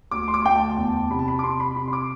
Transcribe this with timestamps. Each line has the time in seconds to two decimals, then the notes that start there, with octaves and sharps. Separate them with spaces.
0.11 D2 D6
0.28 C6
0.34 D6
0.45 D2 G5
0.56 A5
0.78 E2 A5
1.10 C3 B5
1.19 A5
1.28 B5
1.39 D6
1.43 C3 C6
1.60 B5
1.76 C3 B5
1.88 C6
1.93 D6